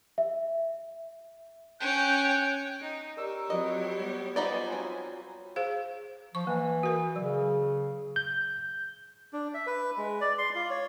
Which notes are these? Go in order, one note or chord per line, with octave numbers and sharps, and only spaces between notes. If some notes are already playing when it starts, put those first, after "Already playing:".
E5
C#4 G5 F#6 G6
D#4
G4 A#4 C#5 D5 E6
F3 F#3 C4 B4 D5 D#5
G3 B3
F3 B3 D#4 C5 D5 G5 G#5
F#3 C4 F4 B5
G#4 C5 F5
F3 C#6
E3 A#3
F#4 A#4
C#3 F#3
G6
D4
E5
B4
G#3
D5
C6
F4
C#5